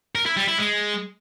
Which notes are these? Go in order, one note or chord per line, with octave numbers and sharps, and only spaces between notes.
A#4
E4
G3
E4
G#3